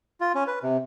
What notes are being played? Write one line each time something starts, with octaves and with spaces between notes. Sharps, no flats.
F4
C#4
B4
C3